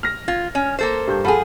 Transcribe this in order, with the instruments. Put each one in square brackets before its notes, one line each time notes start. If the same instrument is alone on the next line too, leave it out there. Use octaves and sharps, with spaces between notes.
[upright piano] F6 A#6
[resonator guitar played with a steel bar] F4 [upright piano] G#6
[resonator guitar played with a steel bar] C#4
A#3 A4 C5
[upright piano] G2 G6
[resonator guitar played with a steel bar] F3 G#4 [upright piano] A4 F#5 B5